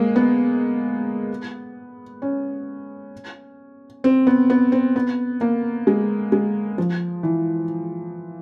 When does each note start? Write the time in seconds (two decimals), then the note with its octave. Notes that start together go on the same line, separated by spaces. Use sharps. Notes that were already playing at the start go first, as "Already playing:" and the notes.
Already playing: G#3 A#3
0.16 B3
2.22 C#4
4.04 C4
4.27 B3
4.50 B3
4.72 C4
4.96 B3
5.41 A#3
5.87 G#3
6.32 G#3
6.78 F3
7.23 E3